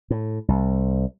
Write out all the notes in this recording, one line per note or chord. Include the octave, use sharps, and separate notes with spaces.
A2
C2